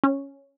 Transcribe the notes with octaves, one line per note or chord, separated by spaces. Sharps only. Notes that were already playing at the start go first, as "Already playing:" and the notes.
C#4